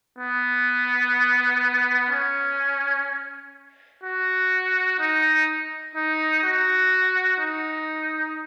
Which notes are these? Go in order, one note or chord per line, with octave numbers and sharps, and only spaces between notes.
B3
C#4
F#4
D#4
D#4
F#4
D#4